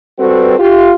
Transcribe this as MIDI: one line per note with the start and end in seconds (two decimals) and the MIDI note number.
0.18 0.55 55
0.18 0.55 60
0.18 0.55 66
0.18 0.55 69
0.18 0.55 71
0.59 0.93 65
0.59 0.93 67